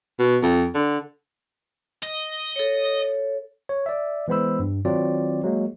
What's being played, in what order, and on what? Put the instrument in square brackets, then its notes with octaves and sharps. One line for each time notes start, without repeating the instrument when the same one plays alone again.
[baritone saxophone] B2
F2
D3
[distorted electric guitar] D#5
[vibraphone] A4 C#5
[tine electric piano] C#5
D5 E5
E3 G#3 B3 C5 B5 E6
G2
D#3 F#3 C4 F4 D5
F#3 G#3 A#3